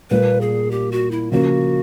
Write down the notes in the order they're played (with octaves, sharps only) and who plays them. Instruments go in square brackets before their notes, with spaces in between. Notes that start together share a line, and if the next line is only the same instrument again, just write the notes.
[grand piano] A#2 G3 A#3 [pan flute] B4
[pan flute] G#4
G4
F#4
E4
[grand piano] C#3 F3 A#3 [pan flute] F#4